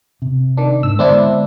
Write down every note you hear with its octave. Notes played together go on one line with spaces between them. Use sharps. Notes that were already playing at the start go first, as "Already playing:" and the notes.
C3
D#3 D4
G#2 E6
D3 G#3 B3 C4 D4 E4